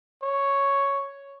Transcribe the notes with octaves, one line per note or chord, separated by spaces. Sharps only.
C#5